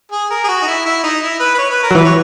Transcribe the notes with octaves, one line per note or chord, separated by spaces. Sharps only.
G#4
A#4
G#4
F#4
D#4
E4
E4
D#4
E4
B4
B4
C#5
B4
A#4
F#3
E3 B4
C#5